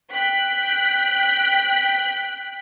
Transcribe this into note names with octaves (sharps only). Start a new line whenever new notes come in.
G5 F#6 B6